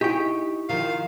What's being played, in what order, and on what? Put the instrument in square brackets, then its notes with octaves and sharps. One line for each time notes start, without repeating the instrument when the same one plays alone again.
[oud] D#4 [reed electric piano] E4 C#6 [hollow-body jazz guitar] G4 G5
[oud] D#3 F3 [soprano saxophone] F5